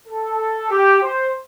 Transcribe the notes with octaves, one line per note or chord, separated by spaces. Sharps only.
A4
G4
C5